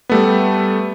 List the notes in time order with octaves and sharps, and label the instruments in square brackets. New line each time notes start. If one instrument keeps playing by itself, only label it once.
[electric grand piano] G3 A3 B3